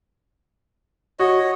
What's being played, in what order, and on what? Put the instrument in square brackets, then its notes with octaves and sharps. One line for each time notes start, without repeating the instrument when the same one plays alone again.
[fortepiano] F#4 [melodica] C#5 D#5